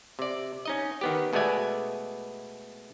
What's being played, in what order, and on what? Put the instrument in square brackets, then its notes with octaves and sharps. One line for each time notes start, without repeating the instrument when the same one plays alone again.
[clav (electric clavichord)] C3 D5
C#4 D#4 D#5
D#3 B3 G4
B2 G#3 A3 B3 D5 G#5